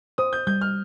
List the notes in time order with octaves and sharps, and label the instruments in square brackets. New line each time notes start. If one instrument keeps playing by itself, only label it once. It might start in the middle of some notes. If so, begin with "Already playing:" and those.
[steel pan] C5 [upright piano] D#6
[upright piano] G6
[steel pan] G3 [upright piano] G6
[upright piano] F6